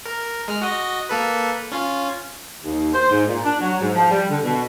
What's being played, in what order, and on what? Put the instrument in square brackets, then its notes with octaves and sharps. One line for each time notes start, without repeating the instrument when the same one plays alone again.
[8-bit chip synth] A#4
G#3 F6
F#4 D#5
A#3 A4 B4
C#4 F4
[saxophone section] D#2
C5
G#2
A#2
D4
F#3
G#2
F3
G3
D3
B2